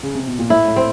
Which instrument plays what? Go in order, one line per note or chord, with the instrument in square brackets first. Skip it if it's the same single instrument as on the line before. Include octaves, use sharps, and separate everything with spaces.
[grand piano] C#3
C3
B2
A#2
[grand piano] A2 [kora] E4
[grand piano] A2
[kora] C4